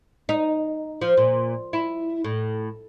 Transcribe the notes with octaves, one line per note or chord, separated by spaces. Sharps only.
D#4
F3
A#2
E4
A2